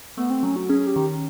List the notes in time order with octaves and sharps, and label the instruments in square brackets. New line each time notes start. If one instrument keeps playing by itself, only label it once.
[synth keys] A3 [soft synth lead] B3
[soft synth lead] C4
[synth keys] F#3 [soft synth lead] C#4
[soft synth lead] F#4
[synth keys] C#4 [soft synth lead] G#4
[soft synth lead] G4
[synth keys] D#3